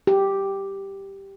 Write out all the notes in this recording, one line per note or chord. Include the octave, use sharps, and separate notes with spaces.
G4